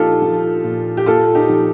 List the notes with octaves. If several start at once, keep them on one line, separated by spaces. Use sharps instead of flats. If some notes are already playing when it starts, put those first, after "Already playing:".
Already playing: A#2 F3 D#4 F4 G4 A4
F3
A#2
G4
A#2 F4 A4
D#4 G4
F3